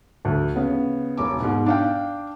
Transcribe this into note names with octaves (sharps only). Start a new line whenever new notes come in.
D2
C#3 B3
E1 D6
G#2 B2
D4 F5 G5